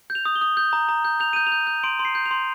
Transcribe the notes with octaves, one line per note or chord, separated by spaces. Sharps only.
G6
F7
D#6
G7
D#6
G6
A#5
A#5
G6
G6 F7
G6 D#7
F7
G6
G6
C6 D7
C6
C7
G6
F7
C6